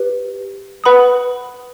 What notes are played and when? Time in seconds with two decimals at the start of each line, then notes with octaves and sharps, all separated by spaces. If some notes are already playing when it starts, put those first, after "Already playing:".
Already playing: G4 B4
0.84 B4 F#5 B5 D#6